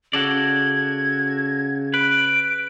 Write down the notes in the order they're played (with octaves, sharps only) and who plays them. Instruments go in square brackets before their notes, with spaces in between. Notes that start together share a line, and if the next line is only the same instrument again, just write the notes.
[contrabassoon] C#3 [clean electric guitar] F#4 A4 D5 [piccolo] G#6
[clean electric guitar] B4 [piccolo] D7